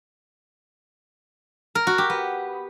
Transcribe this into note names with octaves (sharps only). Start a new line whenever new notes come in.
A#4
F#4
G4
B3